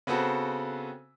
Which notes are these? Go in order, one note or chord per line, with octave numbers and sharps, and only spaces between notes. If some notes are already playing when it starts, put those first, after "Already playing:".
C#3 B3 C4 F#4 A4